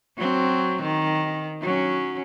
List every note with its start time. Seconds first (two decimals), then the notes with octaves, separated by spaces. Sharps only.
0.17 F#3 C4
0.82 D#3
1.61 F#3 C#4